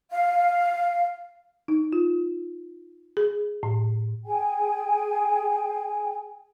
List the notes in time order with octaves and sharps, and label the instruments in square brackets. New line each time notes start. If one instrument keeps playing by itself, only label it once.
[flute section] F5
[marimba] D#4
F4
G#4
A2
[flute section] G#4 G5 G#5